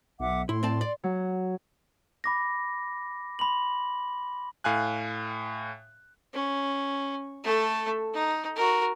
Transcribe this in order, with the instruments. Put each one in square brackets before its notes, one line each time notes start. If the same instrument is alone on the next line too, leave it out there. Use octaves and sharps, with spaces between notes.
[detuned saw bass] B1 [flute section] E5 F#5 D6
[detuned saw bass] A2 [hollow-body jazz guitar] E4 [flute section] C6
[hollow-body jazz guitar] C4 D5 A5
D5
[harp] F#3
[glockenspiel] B5 D6 A#6
B5 C6 F#7
[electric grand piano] A2 F5 G#5 F#6
[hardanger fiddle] C#4
A3 A4
D#4
F#4 A#4